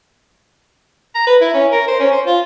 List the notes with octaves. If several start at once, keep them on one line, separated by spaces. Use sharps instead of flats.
A#5
B4
E4
C#4
A#4
C5
C#4
C5
F4